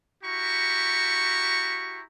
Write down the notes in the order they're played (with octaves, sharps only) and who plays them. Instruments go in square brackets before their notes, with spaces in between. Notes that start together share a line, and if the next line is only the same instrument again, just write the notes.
[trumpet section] E4 F#4 G4 A#5 C#6